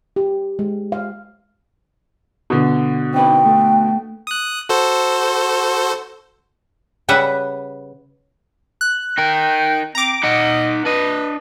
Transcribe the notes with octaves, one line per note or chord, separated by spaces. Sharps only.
G4
G#3
F5
B2 D3
C4 D#4 B4 G5
A3
D#6 F#6
F#4 A4 C5
C#3 G3 B4 E5 F#5
F#6
D#4 A#4 G5
C4 A#5 D6
D#4 D#5 F#5
D4 B4 D#5